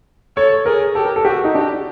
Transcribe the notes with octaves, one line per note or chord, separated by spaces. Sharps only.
A4 C#5
G#4 A#4
G4 A4
A#4
A4
F#4 G4
D#4
D4 G4